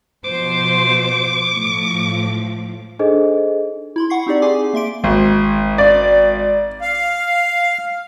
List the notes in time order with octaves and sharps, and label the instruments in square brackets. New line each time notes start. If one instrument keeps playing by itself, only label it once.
[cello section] B2 F3 C5 [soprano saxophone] D6
[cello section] A2 F3
[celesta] D4 D#4 G#4 A4 C5 D#5
[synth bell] E4 B5 C6
F#5 C#6 C7
C4 D#4 G4 D5
G#4 G#5 C6 D6
A#3 E5 C6 D7
[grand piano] G#1
[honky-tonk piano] D5
[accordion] F5